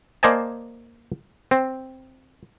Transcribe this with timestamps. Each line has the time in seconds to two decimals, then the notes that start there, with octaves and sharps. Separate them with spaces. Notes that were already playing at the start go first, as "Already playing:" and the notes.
0.23 A#3 C5 D5 D#5 G#5 A5
1.51 C4